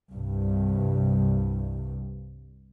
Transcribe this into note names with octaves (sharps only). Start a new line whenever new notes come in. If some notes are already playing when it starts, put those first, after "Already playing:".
C2 G2